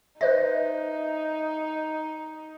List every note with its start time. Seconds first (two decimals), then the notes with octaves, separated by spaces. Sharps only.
0.21 D#4 B4 C5 D#5 E5